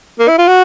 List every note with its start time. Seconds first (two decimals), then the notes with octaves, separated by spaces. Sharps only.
0.19 A#3
0.28 E4
0.38 F4
0.47 F#4